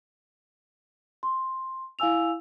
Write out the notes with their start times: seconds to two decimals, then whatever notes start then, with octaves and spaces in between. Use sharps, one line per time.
1.23 C6
1.99 E4 F5 G#5 E6 F7